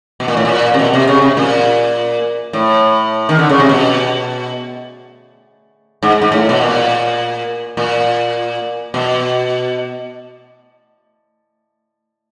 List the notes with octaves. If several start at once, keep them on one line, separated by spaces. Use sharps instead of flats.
B2
A#2
A2
A#2
C3
B2
C3
C#3
C3
A#2
A2
D#3
D3
C#3
C3
B2
G#2
G#2
A2
B2
A#2
A#2
B2